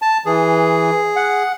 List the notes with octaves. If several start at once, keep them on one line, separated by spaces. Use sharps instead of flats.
A5
E3 G#4
F#5